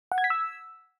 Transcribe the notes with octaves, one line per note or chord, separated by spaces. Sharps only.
F#5
G#6
B6
E6